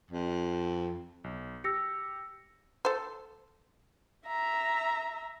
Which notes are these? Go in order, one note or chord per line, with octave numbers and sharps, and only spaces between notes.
F2
B1
G4 E6 A#6 C#7
A4 C5
E5 A#5